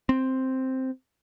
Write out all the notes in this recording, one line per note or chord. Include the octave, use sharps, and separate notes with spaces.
C4